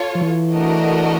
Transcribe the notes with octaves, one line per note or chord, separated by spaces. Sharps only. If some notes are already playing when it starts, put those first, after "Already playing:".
Already playing: F4 A4 C#5
F3
E3
A3 D4 F#4 A#4 D#5